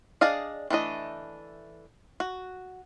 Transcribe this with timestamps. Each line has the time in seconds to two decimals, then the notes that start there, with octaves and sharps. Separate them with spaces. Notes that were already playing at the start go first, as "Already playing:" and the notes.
0.21 D4 G#4 D5 D#5 F5
0.70 E3 A3 D4 D#5
2.20 F#4